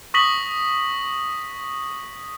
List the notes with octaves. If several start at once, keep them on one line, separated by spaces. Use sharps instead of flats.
C#6 D#6 A#6 B6 F#7